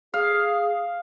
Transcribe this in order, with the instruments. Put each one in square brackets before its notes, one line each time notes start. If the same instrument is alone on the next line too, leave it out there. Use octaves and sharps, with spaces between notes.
[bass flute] G#4 [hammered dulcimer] F5